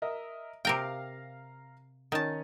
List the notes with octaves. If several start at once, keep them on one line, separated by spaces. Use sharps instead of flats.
A#4 D#5 E5
C3 A#4 F5 G5 A#5
D#3 C#4 D#4 A5